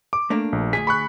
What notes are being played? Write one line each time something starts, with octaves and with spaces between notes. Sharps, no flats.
D6
A3 A#3 D4
A#1
D2 G#2 G#4 B6
B5 C#6 F#6